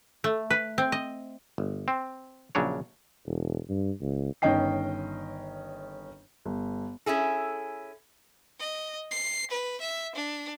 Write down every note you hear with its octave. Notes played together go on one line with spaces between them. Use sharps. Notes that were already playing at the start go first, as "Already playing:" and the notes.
A3
B4
C4
D#5
G1
C4
A#1 C#3 F#3 D4 C#5
E1
G2
C#2
G1 D#3 C#4 D#5 G5 C7
G1
C#4 E4 G#4 A4
D#5
C7
B4
E5
D4